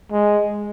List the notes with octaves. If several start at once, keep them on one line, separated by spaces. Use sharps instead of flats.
G#3